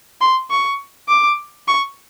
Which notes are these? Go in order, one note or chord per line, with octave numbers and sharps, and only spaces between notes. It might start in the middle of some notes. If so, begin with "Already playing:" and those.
C6
C#6
D6
C#6